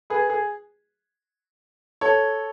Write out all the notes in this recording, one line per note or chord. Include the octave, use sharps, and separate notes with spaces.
G#4 B4
G#4
A4 C#5